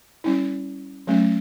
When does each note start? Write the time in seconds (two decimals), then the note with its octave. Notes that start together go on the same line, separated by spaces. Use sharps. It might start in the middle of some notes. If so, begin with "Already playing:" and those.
0.24 G3 C#4 E4
1.07 F#3 A3 C#4